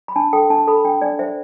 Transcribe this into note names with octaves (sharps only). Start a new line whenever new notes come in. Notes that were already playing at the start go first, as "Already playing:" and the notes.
B5
D4 A5
A4 G5
D4 A5
A4 B5
D4 G5
D4 D5
C5 E5